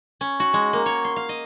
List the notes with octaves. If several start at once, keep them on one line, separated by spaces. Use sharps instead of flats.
C#4
F#4
G#3
A#3
C#5
C6
F5
D#5